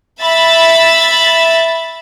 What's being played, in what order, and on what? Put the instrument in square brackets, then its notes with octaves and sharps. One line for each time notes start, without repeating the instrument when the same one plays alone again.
[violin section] E5 B5 A6